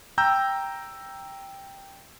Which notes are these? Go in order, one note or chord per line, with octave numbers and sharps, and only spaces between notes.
G5 A#5 E6 G6